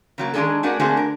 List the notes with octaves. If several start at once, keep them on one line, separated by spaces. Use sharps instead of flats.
C#3 F#3 A#3
D#3 G#3 C4 D4 G#4 A4
A3 D4 F#4 G#4 A#4
D3 A3 A#3 C4 F#4 G#4
A#4